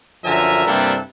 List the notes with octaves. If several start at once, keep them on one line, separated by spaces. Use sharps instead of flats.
F#2 D3 F3 E5 G#5 A#5
G2 C3 A#3 D4 E4 A4